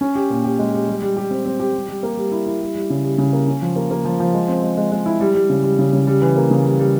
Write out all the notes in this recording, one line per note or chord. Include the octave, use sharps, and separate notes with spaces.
C#4
G4
A#2
G4
G#3
G4
G3
G3
G4
C4
C4
G4
G3
G3
A#3
G3
E4
E4
G3
G3
C#3
G3
C#3
A#3
C#4
F3
A#3
A#3
F3
F3
G#3
C4
G#3
G#3
G#3
E4
G3
G3
C#3
G3
C#3
C#3
G3
E3
A#3
C#3
G3
G3